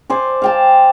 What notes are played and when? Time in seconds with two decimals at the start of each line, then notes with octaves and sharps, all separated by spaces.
0.10 C5 D5 G#5
0.42 F5 G5 A5